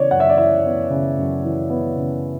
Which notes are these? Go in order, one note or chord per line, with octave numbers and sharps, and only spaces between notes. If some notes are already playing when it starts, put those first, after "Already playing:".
Already playing: C#3 E3 B3 C#5 D5
F#2 F#5
E5
D5
E3 E5
B3
C#3
F#2
E3
B3
C#3